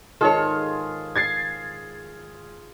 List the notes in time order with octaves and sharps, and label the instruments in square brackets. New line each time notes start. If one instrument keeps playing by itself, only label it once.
[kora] G#2 D#3 [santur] F4 G#4 [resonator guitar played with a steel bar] A4 C#5
[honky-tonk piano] G#6 A6 C7